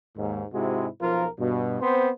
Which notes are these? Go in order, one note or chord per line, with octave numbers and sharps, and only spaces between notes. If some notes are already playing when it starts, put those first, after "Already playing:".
D#2 G#2
G#2 C3 G#3 E4 F#4
B1 F3 F4 A#4
G2 B2
B3 C4 C5